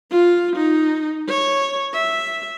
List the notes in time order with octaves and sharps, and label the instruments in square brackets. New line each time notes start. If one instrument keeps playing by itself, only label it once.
[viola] F4
D#4
C#5
E5